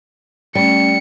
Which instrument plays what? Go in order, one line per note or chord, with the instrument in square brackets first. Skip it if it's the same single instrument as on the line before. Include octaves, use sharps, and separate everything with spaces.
[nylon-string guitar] G3 [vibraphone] A3 C#4 [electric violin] C#7